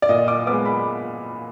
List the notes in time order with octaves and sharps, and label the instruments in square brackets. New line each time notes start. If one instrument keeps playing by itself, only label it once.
[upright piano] D5
A#2 D#5
D6
G#3 B3 D6
B5